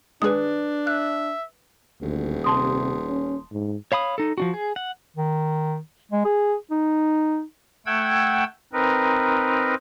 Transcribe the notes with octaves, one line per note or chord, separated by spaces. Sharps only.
D#3 G#3 D4 G#4 B4 D#6
E5 F#6
D#1 D2
C3 A5 C6 D#6
C#4
G#2
C#5 F5 B5 D#6
D#4 A4
F3 D4 F#4
G#4
F#5
D#3
G#3
G#4
D#4
A3 F#5 G5 E6 G#6
C4 D#4 A#4 B4